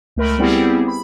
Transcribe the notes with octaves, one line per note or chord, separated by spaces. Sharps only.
C#2 A3 A#4 B5
G3 B3 C4 E4 G4 G#4
B5